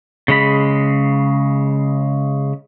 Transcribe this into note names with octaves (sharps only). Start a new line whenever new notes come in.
C#3 G#3 B5